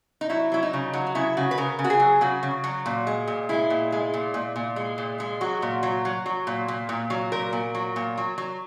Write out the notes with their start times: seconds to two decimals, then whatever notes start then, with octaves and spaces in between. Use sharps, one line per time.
0.21 D#4
0.30 F#3 E4
0.52 F#3 E4
0.63 D#4
0.73 C#3
0.93 F#3
1.07 F#4
1.15 C#3 E4
1.37 C#3 F#4
1.51 B4
1.58 C#3 A#4
1.79 C#3
1.84 F#4
1.90 G#4
2.00 F#3
2.21 C#3 F#4
2.43 C#3
2.64 F#3
2.86 A#2
3.07 G#3
3.27 A#2
3.49 G#3 E4
3.70 A#2
3.92 G#3
4.14 A#2
4.34 A#2
4.56 A#2
4.76 G#3
4.98 A#2
5.20 G#3
5.41 F#3 F#4
5.62 A#2
5.83 F#3
6.05 F#3
6.26 F#3
6.47 A#2
6.68 A#2
6.89 A#2
7.10 F#3
7.32 A#2 A#4
7.53 A#2
7.75 F#3
7.96 A#2
8.17 F#3
8.38 F#3